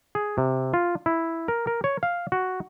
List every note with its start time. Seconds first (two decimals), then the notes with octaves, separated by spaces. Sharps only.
0.15 G#4
0.38 C3
0.74 F4
1.06 E4
1.48 A#4
1.67 A#4
1.84 C#5
2.03 F5
2.32 F#4